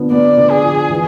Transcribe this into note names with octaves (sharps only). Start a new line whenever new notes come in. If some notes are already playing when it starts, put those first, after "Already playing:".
Already playing: D3 F3 B3
B3 D5
D3
G#4
F3
E3